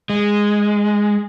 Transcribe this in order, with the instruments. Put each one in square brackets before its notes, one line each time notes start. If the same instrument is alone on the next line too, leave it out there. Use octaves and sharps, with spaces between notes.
[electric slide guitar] G#3